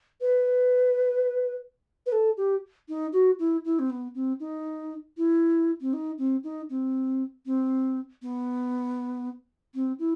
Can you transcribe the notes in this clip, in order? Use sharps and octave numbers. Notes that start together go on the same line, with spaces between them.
B4
B4
A4
G4
D#4
F#4
E4
E4
C4
B3
C4
D#4
E4
C4
D#4
C4
D#4
C4
C4
B3
C4
E4